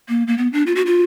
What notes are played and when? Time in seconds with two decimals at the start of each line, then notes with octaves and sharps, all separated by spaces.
0.09 A#3
0.27 A#3
0.38 B3
0.53 D4
0.67 F4
0.76 F#4
0.86 F4